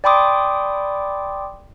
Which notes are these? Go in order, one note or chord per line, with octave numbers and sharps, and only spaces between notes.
D5 G5 B5 C6 D6 D#6